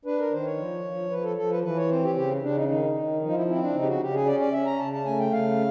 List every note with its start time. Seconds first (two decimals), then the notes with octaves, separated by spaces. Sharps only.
0.05 D4 B4
0.19 A#4
0.31 D#3 C5
0.45 C#5
0.58 F3
0.85 F3
1.10 F3 B4
1.23 A4
1.37 F3 A4
1.50 B4
1.63 E3 B4
1.76 C#5
1.90 C4 C5
2.03 G4
2.15 C#3 G4
2.42 C#3 D4
2.56 D#4
2.68 D#3 D#4
2.94 D#3
3.21 F3 D#4
3.30 F4
3.35 E4
3.47 C4 E4
3.55 D#4
3.61 D4
3.74 C#3 D#4
3.82 G4
3.87 F#4
4.00 C#3 G4
4.14 G#4
4.26 C#4 D5
4.40 D5
4.52 C#4 E5
4.66 A#5
4.79 C#3 A5
4.93 A5
5.05 A3 G#5
5.19 G5
5.32 C#3 F5